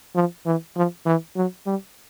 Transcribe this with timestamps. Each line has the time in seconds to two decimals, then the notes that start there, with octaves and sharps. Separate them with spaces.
0.15 F3
0.46 E3
0.76 F3
1.06 E3
1.36 F#3
1.66 G3